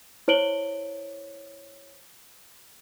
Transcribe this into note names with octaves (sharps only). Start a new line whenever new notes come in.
E4 C5 C#5 D7 F#7 G7